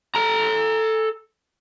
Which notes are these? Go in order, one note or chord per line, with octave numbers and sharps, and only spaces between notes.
A4 A#5